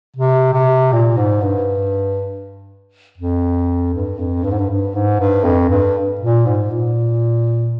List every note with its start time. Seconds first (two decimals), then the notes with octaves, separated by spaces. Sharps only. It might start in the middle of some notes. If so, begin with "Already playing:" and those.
0.16 C3
0.53 C3
0.92 A#2
1.17 G#2
1.42 G2
3.18 F2
3.94 G2
4.19 F2
4.44 G2
4.51 G#2
4.59 G2
4.70 G2
4.95 G#2
5.20 G2
5.44 F2
5.70 G2
6.20 A#2
6.46 G#2
6.71 A#2